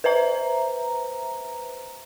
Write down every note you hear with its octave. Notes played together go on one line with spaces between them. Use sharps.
B4 C5 E5 A#5